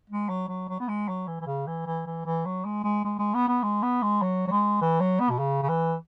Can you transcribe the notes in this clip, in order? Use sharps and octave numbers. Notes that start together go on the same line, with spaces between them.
G#3
F#3
F#3
F#3
B3
G#3
F#3
E3
E3
C#3
E3
E3
E3
E3
F#3
G#3
G#3
G#3
G#3
B3
B3
G#3
B3
G#3
F#3
F#3
G#3
E3
F#3
B3
B2
C#3
C#3
E3